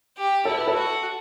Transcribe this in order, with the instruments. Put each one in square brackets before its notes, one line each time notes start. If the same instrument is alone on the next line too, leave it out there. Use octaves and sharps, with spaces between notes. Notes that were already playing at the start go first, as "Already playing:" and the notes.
[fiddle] G4
[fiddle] E4 [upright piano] A4
[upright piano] B4
A4
[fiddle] F#4